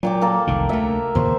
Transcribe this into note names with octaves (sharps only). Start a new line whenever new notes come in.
A#2 F#3 G5 D6
A#3 A4
F1 C2 D#3
D2 A3 A#4 E5
D#2 A#2 C#3 C5 C#6